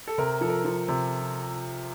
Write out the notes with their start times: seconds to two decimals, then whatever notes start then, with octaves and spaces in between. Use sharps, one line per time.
0.08 A4
0.18 C3 A#4
0.41 F3 A4
0.49 A#4
0.65 F3
0.88 C3